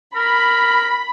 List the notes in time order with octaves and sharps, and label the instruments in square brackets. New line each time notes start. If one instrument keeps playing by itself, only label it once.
[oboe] A#4 [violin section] B5